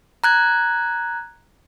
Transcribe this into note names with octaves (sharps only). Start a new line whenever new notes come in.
A#5 F#6 G#6